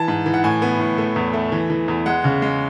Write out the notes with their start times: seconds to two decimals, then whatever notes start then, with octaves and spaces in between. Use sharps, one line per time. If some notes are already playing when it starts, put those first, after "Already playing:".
Already playing: E3 A5
0.08 G#2
0.26 E3
0.34 F#5
0.44 A2 G#5
0.62 B3
0.80 A2
0.98 A3
1.16 E2
1.34 A3
1.52 E3
1.70 E3
1.88 E2
2.06 G#3 F#5
2.24 C#3
2.42 G#3